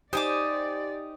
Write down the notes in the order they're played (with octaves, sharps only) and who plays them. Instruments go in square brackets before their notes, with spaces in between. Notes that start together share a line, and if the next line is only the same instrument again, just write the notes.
[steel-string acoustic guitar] D#4 G4 [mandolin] C5 G#5 D6 [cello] D5 [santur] D#6